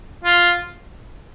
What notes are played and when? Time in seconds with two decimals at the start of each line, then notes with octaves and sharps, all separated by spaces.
0.24 F4